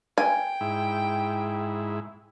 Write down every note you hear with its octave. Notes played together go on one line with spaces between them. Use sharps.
G5 G#5
G#2 E4